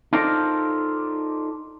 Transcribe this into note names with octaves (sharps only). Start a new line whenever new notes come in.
D#4 F4 A4 A#4 C5 D5